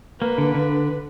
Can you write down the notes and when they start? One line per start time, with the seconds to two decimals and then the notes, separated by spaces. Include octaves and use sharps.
0.21 A#3 B4
0.38 D3
0.55 D3